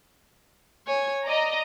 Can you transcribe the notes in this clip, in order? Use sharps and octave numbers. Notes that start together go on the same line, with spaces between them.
C#5 G#5 G#6
D5 D#5 A#5